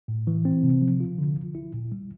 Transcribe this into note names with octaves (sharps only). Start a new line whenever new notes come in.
A2
E3
C4
C3
F3
F4
D3
F3
E4
A#2
G3